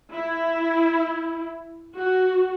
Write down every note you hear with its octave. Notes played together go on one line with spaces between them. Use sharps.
E4
F#4